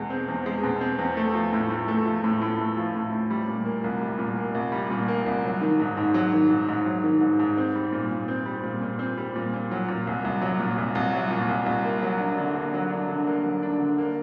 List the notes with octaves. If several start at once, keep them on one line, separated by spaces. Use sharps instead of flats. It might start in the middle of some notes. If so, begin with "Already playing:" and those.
Already playing: E2 B2 G#3
C4
E2
G#3
B2
C4
E2
A3
F3
A2
A2
A3
F3
A2
A2
A3
F3
A2
A2
G3
A#2
A#3
C2
G3
A#2
A#3
C2
G3
A#2
A#3
C2
F#3
D#3
G#2
G#2
F#3
D#3
G#2
G#2
F#3
D#3
G#2
G#2
C4
G3
A#2
A#2
C4
G3
A#2
A#2
C4
G3
A#2
A#2
F#3
A#2
C2
C2
F#3
A#2
C2
C2
F#3
A#2
C2
C2
A#3
F#3
D4
D3
A#3
F#3
D4
D3
A#3
F#3
D4
D3
A#3